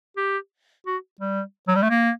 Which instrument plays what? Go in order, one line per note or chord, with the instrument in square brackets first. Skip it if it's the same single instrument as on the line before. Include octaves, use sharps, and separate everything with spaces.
[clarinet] G4
F#4
G3
F#3
G3
A3
A#3